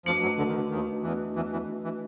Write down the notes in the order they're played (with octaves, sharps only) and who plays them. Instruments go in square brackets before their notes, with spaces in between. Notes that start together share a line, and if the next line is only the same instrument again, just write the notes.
[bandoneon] F2 F3 [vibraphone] A3 D4 F#4 B4 D#5
[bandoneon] F#2 F#3
D2 D3
D#3
D2 D3
D#2 D#3
E2 E3
E2 E3
E2 E3
E3